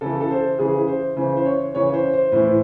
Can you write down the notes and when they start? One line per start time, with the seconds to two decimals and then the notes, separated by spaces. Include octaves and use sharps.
0.01 C#3 E3 A4
0.21 A4
0.31 C5
0.59 C#3 E3 G#4
0.88 C5
1.17 C#3 E3 C5
1.37 C5
1.45 C#5
1.74 C#3 E3 C#5
1.94 C5
2.13 C5
2.32 A2 E3 C5